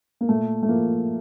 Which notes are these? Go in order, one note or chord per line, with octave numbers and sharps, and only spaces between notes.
A#3
A#2 A3
A3
F3 A#3